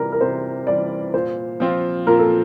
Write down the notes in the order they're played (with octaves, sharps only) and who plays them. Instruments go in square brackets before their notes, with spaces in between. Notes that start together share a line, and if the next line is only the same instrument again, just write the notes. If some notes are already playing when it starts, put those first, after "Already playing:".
Already playing: [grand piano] C3 E3 G3 [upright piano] A#4
[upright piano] A#4
[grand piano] C3 [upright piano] C5
[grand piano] E3 G3 [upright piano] D5
[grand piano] A#2 [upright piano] C5
[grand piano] F3 C4 F4
[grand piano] A#2 [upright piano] A#4
[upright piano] A4